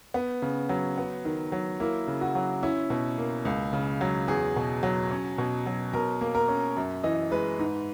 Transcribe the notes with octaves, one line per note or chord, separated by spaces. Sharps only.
B3
C#3
F#3
B3
D#3
F#3
A#3 E4
C#3
F#4
F#3
C#4 E4
B2
A#3
C#2
C#3
F#3
E2 G#4
B2
F#3
C#4
B2
F#3
B2 A#4
A#3
A#4
C#4
F#2
E3 D#5
G#3 B4
G#2